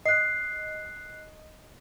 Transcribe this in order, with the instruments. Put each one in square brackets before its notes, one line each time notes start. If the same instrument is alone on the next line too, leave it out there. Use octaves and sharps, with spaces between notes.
[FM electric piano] D#5 [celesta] F#6 C7